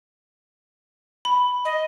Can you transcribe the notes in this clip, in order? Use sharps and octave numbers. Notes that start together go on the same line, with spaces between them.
B5
D#5